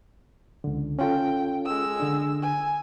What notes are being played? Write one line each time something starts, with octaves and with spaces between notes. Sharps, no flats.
C#2 D3
C#4 F4 A4 G5
G#3 E6
D3 D4
G#5